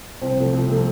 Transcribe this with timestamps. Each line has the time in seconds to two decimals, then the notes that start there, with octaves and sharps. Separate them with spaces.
0.21 C2 C4
0.37 C3 F3 A3
0.53 C2
0.68 C3 F3 A3